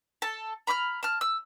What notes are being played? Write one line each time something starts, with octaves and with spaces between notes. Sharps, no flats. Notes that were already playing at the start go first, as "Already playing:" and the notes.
A4 A5
A#5 B5 D6 F6
A5 F6
E6